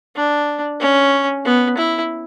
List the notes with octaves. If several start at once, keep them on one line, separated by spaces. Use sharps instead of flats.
D4
C#4
B3
E4